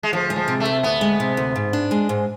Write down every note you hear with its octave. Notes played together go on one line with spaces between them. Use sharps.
G#3
D2 F3
G#3
F3
C3
A3
D2
D2 B3
G#3
C3
D2
G#2
D4
G#3
G#2